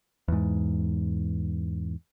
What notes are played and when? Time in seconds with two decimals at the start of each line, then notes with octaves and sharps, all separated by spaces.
0.28 E2 G#2